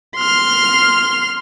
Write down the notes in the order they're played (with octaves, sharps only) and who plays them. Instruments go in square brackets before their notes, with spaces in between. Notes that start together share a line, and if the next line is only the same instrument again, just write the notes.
[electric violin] C6 F6